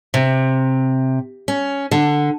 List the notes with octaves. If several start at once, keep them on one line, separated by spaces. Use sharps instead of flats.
C3
C#4
D3